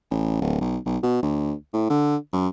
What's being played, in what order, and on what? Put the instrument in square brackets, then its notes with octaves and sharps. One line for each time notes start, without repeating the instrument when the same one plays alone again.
[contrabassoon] A1
D1
B1
B1
B2
D2
A2
D3
F#2